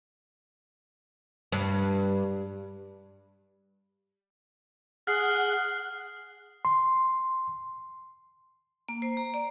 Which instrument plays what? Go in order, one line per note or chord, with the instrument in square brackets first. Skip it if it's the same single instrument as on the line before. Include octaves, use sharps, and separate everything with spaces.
[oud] G2
[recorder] G#4 [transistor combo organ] F#5 [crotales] F6 C7
[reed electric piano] C6
[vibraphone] A#3
C5
A#5
D5